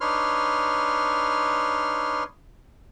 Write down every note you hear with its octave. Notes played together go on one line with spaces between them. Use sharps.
D4 D#4 B4 C#5 C6 F6